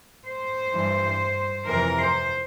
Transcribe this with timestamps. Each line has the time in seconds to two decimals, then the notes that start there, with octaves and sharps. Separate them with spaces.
0.27 C5
0.73 G2 E3
1.66 F2 C3 E3 A#4
1.99 C5